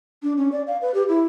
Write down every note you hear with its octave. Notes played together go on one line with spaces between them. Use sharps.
D4
C#4
D5
F5
B4
G4
E4